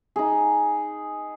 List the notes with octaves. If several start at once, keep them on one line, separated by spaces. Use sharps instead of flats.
D#4 G#4